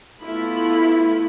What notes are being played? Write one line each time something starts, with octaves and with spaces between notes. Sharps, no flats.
A3 B3 E4 F4 A4 B5